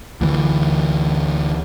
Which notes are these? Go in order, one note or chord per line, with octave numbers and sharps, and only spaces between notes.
D2 E3